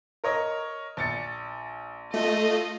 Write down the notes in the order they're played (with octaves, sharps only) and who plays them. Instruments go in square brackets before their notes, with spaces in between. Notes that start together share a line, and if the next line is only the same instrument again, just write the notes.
[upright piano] A#4 C#5 D#5
A#1 A6 C#7
[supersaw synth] A3 [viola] F4 D#5